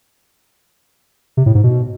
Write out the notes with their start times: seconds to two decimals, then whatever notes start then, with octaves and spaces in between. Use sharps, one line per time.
1.37 C3
1.46 A2
1.55 G#2
1.63 B2